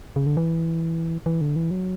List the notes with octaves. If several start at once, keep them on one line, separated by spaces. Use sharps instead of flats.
C#3
D3
E3
E3
D3
E3
F#3